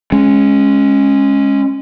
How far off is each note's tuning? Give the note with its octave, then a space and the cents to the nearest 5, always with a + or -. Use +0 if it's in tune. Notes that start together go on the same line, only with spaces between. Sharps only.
G#3 +0 C#4 -15